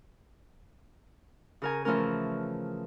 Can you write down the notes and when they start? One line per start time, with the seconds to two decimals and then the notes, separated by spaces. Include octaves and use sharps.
1.62 C#3 A#4 G#5
1.85 E3 F3 A3 C#4 A#4